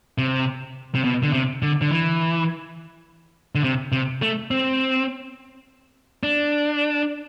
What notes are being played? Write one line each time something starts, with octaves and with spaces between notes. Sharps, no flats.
C3
C3
B2
D3
C3
D3
D3
E3
D3
C3
C3
A3
C4
D4